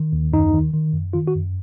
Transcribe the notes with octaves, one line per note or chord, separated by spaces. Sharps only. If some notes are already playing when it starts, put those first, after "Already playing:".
Already playing: D#3
D#2
F#2 D#4
D#3
D#3
F#2
D#3 F4
F#4
F#2